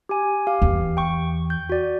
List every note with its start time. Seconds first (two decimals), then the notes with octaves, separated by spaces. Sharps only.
0.09 G4 G#5
0.47 G4 F5
0.62 E2
0.97 G5 C#6
1.50 G6
1.69 F#4 D5